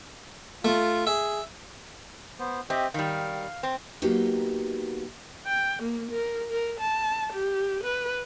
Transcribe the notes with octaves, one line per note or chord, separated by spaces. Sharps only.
A3 F4
G#4 E5
B3 C5
C4 G4 D#5 E5
D#3 G3 F5
C4
F#3 A#3 B3 D#4 F#4 G4
G5
A#3
A#4
A#4
A5
G4
B4